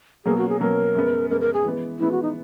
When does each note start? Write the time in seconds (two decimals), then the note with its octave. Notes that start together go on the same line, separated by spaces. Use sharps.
0.25 B2 F#3 A#3 C#4 G#4
0.37 F#4
0.49 G#4
0.60 B2 F#3 A#3 C#4 A#4
0.95 F#2 C#3 G#3 B3
1.30 F#2 C#3 G#3 B3 A#4
1.41 A#4
1.53 G#4
1.64 E3 G#3 B3
1.99 E3 G#3 B3 E4
2.11 F#4
2.22 D#4